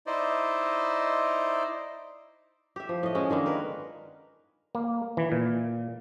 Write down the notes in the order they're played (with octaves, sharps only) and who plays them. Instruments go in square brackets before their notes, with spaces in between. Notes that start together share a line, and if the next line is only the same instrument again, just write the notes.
[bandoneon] D#4 E4 C5 D5 D#5
[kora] G4 E5
F3
A2 D#5
G#3 C#4
D3 D#3 G#3 A#3
A#4 B4
[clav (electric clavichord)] A#3
E3
A#2